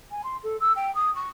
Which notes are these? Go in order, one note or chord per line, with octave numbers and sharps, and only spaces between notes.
G#5
C6
A4
E6
G5
D#6
C#6